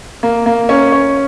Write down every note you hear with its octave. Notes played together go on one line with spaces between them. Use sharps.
A#3
A#3
C#4
C#4